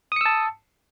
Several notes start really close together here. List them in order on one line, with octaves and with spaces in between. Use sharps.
D#6 C#7 E6 A5